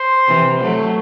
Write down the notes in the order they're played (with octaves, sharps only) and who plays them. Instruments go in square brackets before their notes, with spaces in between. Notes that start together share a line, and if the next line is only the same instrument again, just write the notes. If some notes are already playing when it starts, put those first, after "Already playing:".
Already playing: [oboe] C5
[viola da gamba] C3 E3
F#3 A3